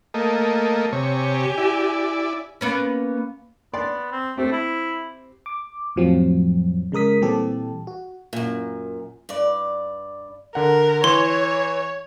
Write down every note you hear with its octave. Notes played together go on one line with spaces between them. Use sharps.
A3 A#3 D#5
C3 G4 C#5 G#5
E4 D5
A#3 B3 C#4
B3 D5 C6
C4
A3 C4 G4 C5
E4
D6
F2 A2 F3 F#3 C4
C#3 G#3 A#4 D#6 B6
A#2 E3 G3 C4 G4 A4
F#4
F#2 A#2
G2 D5
D3 A#4 F#5
E3 C#5 C6